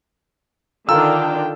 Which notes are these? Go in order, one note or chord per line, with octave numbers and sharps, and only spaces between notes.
D3 D#3 D4 F4 A4 G5 A#5 E6